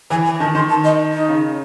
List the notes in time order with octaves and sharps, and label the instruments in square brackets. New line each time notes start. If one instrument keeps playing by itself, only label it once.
[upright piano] E3 [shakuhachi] G#5
[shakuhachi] G#5
[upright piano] D#3 [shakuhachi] A5
[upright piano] D#3 [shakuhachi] C6
[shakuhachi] A5
D#5
D#4
[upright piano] C#3